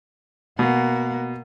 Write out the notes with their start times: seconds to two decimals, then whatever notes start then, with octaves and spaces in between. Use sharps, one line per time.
0.59 B2 A#3 F#5